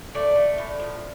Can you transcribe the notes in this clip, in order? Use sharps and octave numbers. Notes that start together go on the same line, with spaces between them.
A3 D5
A3
A2
F3